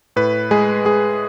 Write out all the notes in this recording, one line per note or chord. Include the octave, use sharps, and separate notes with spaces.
A2 B4
G#3 G#4
G#3 G#4